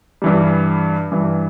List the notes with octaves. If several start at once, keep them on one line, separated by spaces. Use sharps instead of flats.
G2 E3 G3
G2 E3 G3